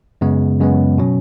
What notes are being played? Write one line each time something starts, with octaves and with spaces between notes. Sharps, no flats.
F#2 C#3 G#3 B3
F#2 C#3 G#3 B3
B2 F#3 C#4